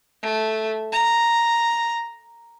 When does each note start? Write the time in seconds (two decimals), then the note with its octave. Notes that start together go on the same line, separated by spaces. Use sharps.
0.23 A3
0.92 A#5